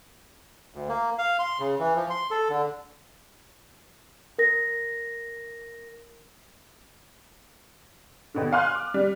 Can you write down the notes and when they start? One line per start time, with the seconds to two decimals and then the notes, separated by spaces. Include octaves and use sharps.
0.74 D2
0.89 A#3
1.18 F5
1.39 C6
1.60 C#3
1.79 E3
1.96 F3
2.10 C6
2.31 A4
2.49 D3
4.39 A#4 A#6
8.34 D#2 B2 D3
8.53 F5 G#5 C6 F6 F#6
8.75 D6
8.94 G3